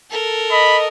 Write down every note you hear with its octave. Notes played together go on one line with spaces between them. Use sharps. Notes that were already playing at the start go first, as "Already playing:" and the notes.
A4 A#4
D#5 B5